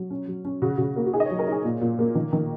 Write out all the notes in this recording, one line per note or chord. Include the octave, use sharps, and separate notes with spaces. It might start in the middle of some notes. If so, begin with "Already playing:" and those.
Already playing: F#3
C#4
F#3
C#4
C#3 F#4
C#3 F#4
A#3
F#4
D#4 G#4
D#5
C#5
F#3
A#4
D#4 G#4
A#2
A#2
A#3
D#3
D#3